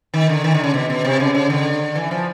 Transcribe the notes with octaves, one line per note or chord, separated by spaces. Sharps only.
D#3
D3
D#3
D3
C#3
B2
B2
C3
C#3
C#3
D3
E3
F3